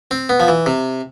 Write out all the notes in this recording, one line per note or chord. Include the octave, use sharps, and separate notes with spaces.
C4
B3
F3
E3
C3